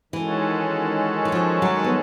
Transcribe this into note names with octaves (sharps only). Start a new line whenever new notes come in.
D#3 E3 G#3 C#4 F#4 A4
E3
F3
F#3
B3